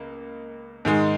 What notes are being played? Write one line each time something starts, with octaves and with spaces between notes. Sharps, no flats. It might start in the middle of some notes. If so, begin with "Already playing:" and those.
Already playing: C#2 A#3
G#2 D#3 G#3